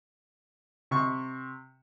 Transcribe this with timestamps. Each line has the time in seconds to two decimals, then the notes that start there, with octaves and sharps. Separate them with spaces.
0.91 C3 C#6